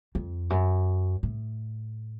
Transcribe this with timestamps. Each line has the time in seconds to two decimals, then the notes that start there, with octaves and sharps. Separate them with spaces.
0.15 F2
0.50 F#2
1.23 A2